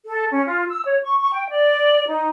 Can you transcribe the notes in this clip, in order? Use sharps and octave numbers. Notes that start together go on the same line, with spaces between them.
A4
C#4
F4
E6
C#5
C#6
C#6
G5
D5
D#4